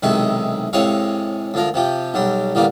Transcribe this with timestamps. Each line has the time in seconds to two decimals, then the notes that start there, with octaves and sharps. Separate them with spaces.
0.03 B1 C3 D#3 G#3 E4 C#6
0.73 A2 C3 G#3 C#5 F5 C#6
1.54 D2 F3 A#4
1.74 C3 F3 G4
2.14 B1 F#3 G3
2.55 A1 D3 G3 A#3 B3